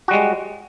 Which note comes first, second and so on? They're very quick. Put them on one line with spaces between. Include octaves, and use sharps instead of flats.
F#4 G3 G#3